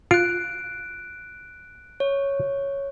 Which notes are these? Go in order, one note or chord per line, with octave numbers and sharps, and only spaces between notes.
F4 F#6 D7
C#5